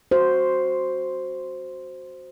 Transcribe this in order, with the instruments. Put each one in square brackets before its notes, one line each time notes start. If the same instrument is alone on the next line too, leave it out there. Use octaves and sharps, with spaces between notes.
[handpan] F#4 C5